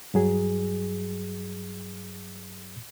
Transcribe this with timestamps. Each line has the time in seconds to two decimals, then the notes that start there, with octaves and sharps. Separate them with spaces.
0.14 G2 F#3 G#4